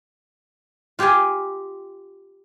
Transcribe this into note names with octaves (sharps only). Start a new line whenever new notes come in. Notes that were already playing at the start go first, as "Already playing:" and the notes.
F4 G4 G#4 G5 G#5